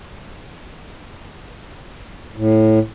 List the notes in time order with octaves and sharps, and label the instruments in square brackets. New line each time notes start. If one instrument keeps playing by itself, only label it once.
[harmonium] A2